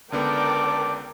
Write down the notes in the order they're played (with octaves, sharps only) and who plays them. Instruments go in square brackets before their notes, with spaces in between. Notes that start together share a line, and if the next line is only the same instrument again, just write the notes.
[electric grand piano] C#2 D3 B3 [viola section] A#4 D5 G5 [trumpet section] A5 D6